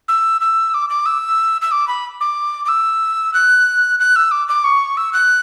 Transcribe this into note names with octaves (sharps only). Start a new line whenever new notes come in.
E6
E6
D6
D6
E6
E6
D6
B5
D6
D6
E6
F#6
F#6
E6
D6
D6
C#6
E6
F#6